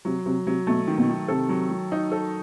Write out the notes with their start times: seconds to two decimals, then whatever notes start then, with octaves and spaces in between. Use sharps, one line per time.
0.05 C3 F#3
0.26 C3 F#3
0.47 C3 F#3
0.67 B2 A3
0.88 D#3
0.98 B2
1.09 D#3
1.28 C3 A4
1.49 F#3
1.70 F#3
1.92 D#4
2.12 A4